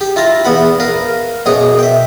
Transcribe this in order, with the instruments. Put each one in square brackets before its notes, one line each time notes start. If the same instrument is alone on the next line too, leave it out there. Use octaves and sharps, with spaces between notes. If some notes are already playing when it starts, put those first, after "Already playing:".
[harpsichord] G4
E4 F4 A5 A#5
E2 B3 F#5 B5
A#4 B4 F5
F#2 B2 G#4 C#5 D#6
E5 G5